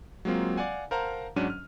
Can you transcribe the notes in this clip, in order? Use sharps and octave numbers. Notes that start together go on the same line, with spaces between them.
F#3 G#3 A#3 C4 F4
D5 F5 F#5 G#5
A#4 C5 F5 F#5 A5 A#5
G#2 F#3 C#4 D4 F#5 D#7
F6